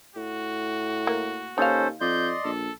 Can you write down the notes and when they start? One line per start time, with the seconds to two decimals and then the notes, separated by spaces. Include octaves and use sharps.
0.16 A2 F#4
1.07 A#3
1.58 D#2 C#4 D#4 A4 C5 F5
2.01 F2 D5 D#5 C6 G6
2.44 A#1 A4